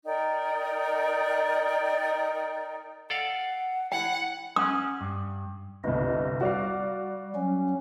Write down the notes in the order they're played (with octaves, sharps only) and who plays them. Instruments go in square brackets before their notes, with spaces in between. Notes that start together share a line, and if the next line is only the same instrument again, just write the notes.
[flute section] D#4 A#4 D5 G5
[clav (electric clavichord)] A4 D5 F5 [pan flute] F#5
[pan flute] E4 [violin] F#5 [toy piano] G5
[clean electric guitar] C#4 F#5 [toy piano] D#6
[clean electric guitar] G2
[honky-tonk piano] G1 C2 [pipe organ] D#5
[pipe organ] G3 [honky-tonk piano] F#4 D5 F5
[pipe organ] F#3 C#4